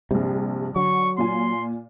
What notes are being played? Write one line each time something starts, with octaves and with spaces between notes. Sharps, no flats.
A#1 G2 C3
D3 F#3 C#6
A#2 F4 G#5 C6